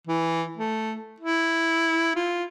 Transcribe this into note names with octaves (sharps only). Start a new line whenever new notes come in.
E3
A3
E4
F4